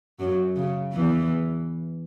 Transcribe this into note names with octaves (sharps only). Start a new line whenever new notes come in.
F#2 F#3
C#3
E2 E3